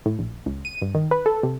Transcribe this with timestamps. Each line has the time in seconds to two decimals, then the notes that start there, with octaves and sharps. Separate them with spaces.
0.06 A2
0.19 A#1
0.46 C#2
0.65 D#7
0.82 G2
0.95 D#3
1.11 B4
1.26 A4
1.43 C3